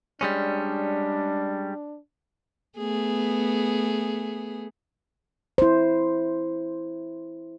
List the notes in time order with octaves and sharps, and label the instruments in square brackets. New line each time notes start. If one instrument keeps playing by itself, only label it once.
[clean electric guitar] G3 G#3 C#4 [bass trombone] D4
[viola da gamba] A3 B3 G#4
[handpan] E4 C5